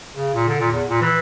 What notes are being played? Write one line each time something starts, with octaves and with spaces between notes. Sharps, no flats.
C#3
A#2
D3
A#2
E2
A#2
E3